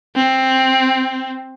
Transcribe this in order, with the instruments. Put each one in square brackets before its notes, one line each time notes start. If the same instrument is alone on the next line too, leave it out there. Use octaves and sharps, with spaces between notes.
[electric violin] C4